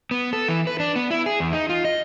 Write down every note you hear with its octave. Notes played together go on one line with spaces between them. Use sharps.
B3
A4
E3
B4
D4
B3
E4
G#4
E2
D#4
F4
D#5